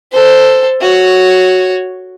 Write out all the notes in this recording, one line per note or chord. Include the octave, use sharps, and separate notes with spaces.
A4 C5
F#4 C#5